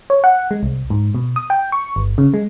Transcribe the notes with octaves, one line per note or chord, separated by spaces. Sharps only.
C#5
F#5
G#3
C2
G#2
B2
D#6
G5
C#6
G1
C#3
G#3